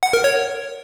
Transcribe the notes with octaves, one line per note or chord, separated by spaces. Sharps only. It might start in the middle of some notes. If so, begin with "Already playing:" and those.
F#5
A#4
C#5